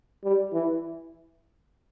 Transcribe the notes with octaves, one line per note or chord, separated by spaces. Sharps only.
G3
E3